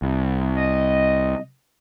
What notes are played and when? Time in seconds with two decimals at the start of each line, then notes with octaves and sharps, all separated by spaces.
0.02 C2
0.56 D#5